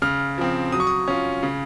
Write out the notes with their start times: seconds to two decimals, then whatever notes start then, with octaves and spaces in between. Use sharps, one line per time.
0.02 C#3 F6
0.38 F3 C4
0.72 F#3 D#6
0.80 C#6
0.87 D#6
1.08 C#4 F4
1.43 C#3